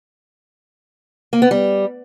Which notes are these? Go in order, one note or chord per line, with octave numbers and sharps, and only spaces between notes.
A#3
B3
G3